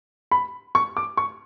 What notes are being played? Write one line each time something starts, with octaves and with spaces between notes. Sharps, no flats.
B5
C#6
D6
C#6